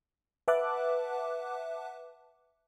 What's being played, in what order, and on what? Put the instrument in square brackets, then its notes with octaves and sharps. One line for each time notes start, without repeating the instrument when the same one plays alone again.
[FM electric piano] B4 E5 F#5 A5 D6 F#6